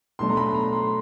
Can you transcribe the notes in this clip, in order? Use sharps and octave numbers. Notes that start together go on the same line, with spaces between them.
B2 F#3 A3 D4 C6
A#5
B5
A#5
C6